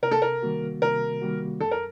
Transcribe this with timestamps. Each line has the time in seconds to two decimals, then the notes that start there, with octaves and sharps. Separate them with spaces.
0.03 C3 A#4
0.11 A4
0.22 A#4
0.42 D#3 G3 A#3 F#4
0.82 C3 A#4
1.21 D#3 G3 A#3 F#4
1.61 F#2 A4
1.71 A#4